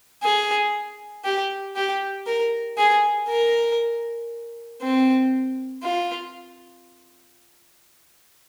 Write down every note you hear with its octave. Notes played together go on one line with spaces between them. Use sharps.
G#4
G4
G4
A#4
G#4
A#4
C4
F4